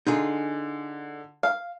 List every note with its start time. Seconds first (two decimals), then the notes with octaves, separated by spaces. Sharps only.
0.07 D3 D#4 F4 G#4
1.43 F5